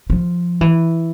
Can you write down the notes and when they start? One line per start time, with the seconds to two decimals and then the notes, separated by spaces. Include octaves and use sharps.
0.10 F3
0.61 E3